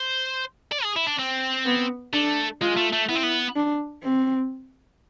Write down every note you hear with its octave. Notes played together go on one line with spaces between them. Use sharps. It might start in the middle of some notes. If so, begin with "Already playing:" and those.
Already playing: C5
D5
G#4
E4
D4
C4
B3
A3 D4
G#3 F4
A3
A3
B3 E4
C4
B3
D4
C4